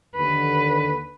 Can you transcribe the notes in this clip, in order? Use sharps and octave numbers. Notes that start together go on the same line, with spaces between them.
D#2 D3 B4